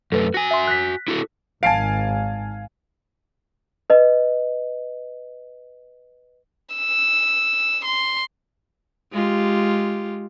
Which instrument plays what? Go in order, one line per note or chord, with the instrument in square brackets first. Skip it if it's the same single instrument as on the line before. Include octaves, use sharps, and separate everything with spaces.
[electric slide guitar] F#2 A3 [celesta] A4 B4
[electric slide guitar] F#4 G#5 [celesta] A#6
[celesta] E5 C6
F#6 A#6 B6
[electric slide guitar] E4 F#4 A4
[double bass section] G#1 [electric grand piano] F5 G#5 [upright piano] A5 C7 D7
[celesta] B4 D#5
[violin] E6
C6
[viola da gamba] G#3 F4 G4